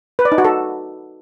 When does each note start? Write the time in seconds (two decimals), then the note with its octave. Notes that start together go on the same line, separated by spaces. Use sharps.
0.19 B4
0.25 D5
0.32 D#4
0.38 F#4
0.45 A4